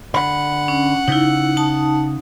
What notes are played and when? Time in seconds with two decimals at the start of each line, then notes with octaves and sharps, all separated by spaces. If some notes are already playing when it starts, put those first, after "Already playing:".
0.14 D3 F#5 B5
0.68 C#4
1.08 C#3 D#4 E4
1.57 D#4 A5 D#6